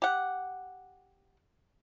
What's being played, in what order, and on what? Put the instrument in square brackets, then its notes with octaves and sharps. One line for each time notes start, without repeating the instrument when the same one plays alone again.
[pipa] G4 F#5